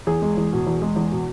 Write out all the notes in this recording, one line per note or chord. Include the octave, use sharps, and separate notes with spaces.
E2 G#4
G#3
E2
B2
E2
G#3
E2
B2